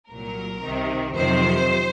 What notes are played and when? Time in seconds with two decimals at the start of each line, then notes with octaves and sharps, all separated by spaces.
0.10 C2 A#2 F#3 A#4
0.63 C2 C3 D#3
1.16 F2 C3 D#3 F#3 C5